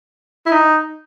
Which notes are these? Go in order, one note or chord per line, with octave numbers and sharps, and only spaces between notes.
E4
D#4